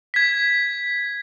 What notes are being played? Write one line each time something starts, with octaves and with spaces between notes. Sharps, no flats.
G#6 B6